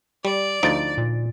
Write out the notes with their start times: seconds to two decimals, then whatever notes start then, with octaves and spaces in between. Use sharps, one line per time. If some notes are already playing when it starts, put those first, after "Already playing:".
0.25 G3 D5
0.63 D2 F3 D#4 A6 D7
0.98 A#2